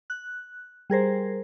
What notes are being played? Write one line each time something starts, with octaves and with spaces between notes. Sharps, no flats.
F#6
G3 G#4 A#4 C5